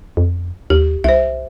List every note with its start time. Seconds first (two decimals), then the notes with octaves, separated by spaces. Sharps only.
0.17 F2
0.70 D#2 G4
1.04 C2 C5 E5